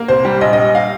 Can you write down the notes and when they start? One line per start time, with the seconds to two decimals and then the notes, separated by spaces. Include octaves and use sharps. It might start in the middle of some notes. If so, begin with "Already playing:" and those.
Already playing: A#3
0.08 C2 C5
0.25 G3
0.41 A#1 D#5
0.53 D#5
0.58 G3
0.75 F5